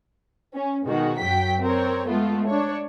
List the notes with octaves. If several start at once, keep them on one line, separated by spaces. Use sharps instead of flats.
C#4
B2 D#3 G#3 F#4
F#2 F#3 G5 B6
C4 A#4 C#5
G#3 A3 B3 F4
D4 C#5